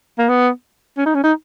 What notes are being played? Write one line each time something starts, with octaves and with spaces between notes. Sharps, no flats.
A#3
B3
C#4
D#4
C#4
D#4